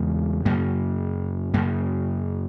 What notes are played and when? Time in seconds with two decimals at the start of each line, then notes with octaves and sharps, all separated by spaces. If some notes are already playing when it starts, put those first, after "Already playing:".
Already playing: E2 C#3 G#3
0.45 F#2 C#3 A#3
1.54 F#2 C#3 A#3